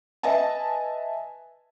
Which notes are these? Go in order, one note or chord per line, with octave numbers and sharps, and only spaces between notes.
B4 D#5 E5 G#5 A5